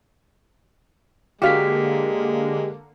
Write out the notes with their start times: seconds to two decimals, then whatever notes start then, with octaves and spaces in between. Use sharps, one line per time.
1.42 D3 G#3 A#3 F#4 G4 F5 B6